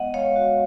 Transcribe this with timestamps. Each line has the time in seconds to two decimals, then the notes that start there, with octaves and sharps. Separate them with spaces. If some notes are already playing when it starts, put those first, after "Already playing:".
Already playing: G#3 B3 D#5 F#5
0.14 G#3 C#5 F5
0.36 F#4